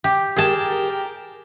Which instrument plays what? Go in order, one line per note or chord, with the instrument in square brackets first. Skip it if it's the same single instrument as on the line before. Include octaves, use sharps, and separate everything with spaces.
[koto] G4
[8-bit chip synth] G4 A#4 G5 [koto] G#4 A5